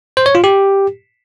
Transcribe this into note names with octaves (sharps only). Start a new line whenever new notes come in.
C5
C#5
F4
G4